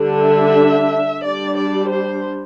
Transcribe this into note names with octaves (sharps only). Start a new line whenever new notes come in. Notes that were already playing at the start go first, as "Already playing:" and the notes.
Already playing: D3 G3 D4
E5
G3 D4 D5
D5
C5